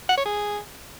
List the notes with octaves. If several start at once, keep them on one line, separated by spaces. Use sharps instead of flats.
F#5
C#5
G#4